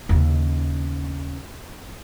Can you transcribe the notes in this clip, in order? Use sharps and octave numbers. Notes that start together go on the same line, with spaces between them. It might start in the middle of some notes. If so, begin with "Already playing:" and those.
D#2 C#3